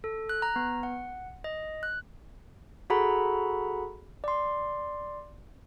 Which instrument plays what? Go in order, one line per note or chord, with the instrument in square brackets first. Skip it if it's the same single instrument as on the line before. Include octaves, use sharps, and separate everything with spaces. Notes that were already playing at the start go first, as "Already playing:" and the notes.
[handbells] A4
F#6
A#5
B3
F#5
D#5
F#6
F#4 G#4 A4 F#5 A#5 B5
D5 C6